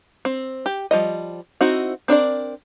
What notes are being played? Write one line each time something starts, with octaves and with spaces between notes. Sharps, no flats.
C4
G4
F3 G3 D#5
C4 D#4 E4 F#4
C4 D4 A#4 D5